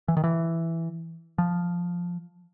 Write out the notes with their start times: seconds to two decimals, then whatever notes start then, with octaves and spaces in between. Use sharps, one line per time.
0.08 E3
0.17 D#3
0.24 E3
1.38 F3